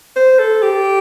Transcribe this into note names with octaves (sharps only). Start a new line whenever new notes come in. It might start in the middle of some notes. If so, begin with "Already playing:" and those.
C5
A4
G4